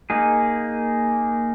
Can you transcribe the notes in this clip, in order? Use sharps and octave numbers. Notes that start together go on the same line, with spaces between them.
A#3 D#4 G#4